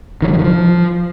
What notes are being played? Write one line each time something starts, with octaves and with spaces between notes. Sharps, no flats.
D#3
F#3
F3
D#3
F3